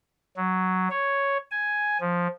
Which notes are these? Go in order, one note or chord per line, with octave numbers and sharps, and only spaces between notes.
F#3
C#5
G#5
F3